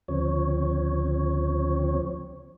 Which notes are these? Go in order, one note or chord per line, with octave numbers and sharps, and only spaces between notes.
D2 C#3 F3 C4 C#5